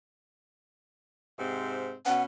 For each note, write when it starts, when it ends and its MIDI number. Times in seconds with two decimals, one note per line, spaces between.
1.39 1.94 44
1.39 1.94 48
1.39 1.94 60
2.06 2.24 47
2.06 2.24 59
2.06 2.24 61
2.06 2.22 78